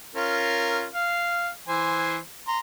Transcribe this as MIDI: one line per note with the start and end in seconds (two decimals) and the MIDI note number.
0.15 0.86 61
0.15 0.86 65
0.15 0.86 70
0.94 1.50 77
1.68 2.18 52
1.68 2.18 72
1.68 2.18 80
2.48 2.59 82
2.48 2.59 84